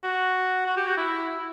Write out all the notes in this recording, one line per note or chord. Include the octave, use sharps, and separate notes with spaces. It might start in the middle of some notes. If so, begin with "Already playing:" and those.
F#4
F#4
G4
F#4
E4
E4